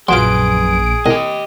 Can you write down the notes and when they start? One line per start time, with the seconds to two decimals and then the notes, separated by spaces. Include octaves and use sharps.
0.09 A#1 F#2 F#3 F4 G#4 B4 C6 D7
1.06 C2 G4 D#5